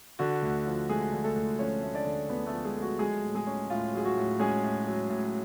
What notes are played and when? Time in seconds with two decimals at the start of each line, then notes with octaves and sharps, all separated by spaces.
0.19 D3 F#4
0.42 D2
0.66 F3
0.89 G#3 A3 G#4
1.13 D3
1.24 A3 A4
1.36 D2
1.59 F3 C#4 C#5
1.82 A3
1.94 D4 D5
2.06 D3
2.29 D2 B3 B4
2.47 A3 A4
2.52 F3
2.65 G#3 G#4
2.77 A3
2.82 F#4
2.99 F#3 G#3 G#4
3.24 A2
3.35 G#3 G#4
3.47 C#4
3.70 A2 F4
3.94 F#3 G#4
4.05 F#4
4.17 A2
4.39 G#3 C#4 G#4
4.64 A2
4.87 F#3
5.10 A2